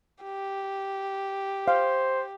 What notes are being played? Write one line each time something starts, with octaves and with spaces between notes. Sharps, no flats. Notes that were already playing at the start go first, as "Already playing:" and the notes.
G4
C5 F5